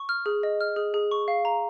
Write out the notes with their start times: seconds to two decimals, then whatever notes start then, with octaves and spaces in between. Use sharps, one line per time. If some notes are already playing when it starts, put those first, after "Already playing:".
Already playing: C#6
0.09 F6
0.26 G#4
0.43 D#5
0.61 F6
0.76 G#4
0.94 G#4
1.11 C#6
1.28 F5
1.45 A#5